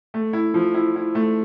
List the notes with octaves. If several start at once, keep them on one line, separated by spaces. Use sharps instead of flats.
A3
E4
F3
E4
E4
A3